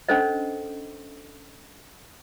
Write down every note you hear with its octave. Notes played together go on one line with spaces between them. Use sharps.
C#4 D4 A4 C5 D#5